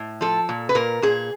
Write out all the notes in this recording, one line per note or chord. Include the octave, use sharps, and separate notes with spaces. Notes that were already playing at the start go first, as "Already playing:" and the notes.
Already playing: A2
F3 A4
A#2
B4
A#2 A#4
A#2 G#4